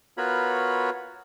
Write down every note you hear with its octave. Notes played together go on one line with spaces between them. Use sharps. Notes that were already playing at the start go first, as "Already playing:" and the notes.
B3 F4 F#4 A#4 C#5 B5